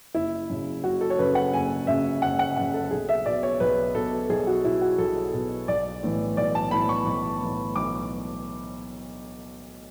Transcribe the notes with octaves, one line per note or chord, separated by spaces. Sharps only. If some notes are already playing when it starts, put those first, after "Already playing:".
F#1 E4
F#2 C#3
F#1 F#4
A4
C#5
F#2 C#3 B4
F#5
F#1 G#5
F#2 C#3 E5
F#1 F#5
F#5
F#2 C#3 F#5
A4
B1 G#4
E5
B2 D5
C#5
B1 B4
B2 A4
B1 G#4
F#4
B2 E4
F#4
B1 A4
B2
B1 D5
A2 E3
B1 D5
A5
A2 E3 B5
C#6
B1 C#6
A2 E3
B1 D6